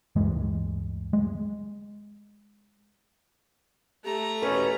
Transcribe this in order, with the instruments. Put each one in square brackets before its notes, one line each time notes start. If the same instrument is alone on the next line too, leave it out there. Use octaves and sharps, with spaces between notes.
[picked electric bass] D1 G2 E3 G#3
G#3
[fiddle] A3 A#5 [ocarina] G4
[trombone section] E2 B2 C#4 [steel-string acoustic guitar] B4